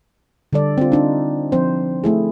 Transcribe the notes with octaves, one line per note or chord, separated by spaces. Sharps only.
D3 G3 A4 D5
C4 F4
D4 D#4
F3 C4 C5
A3 E4 G#4